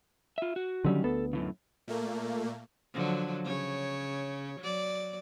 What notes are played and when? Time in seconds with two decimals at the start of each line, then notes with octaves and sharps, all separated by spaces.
0.38 F4 E5
0.56 F#4
0.84 D3 D#3 F#3 G3 C#4
1.04 D2 B3 A4
1.33 F#2 A2 C#3
1.88 A#2 A3 A#3
2.94 D3 F3 F#3
3.44 C#3 C#5
4.60 F#3 D5